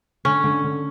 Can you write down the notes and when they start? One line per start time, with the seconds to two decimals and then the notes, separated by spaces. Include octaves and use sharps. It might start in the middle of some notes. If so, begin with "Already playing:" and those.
0.25 D3 C#4
0.44 D3
0.64 D3